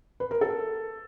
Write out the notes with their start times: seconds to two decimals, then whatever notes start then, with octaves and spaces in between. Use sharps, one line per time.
0.20 B4
0.31 A#4
0.41 A4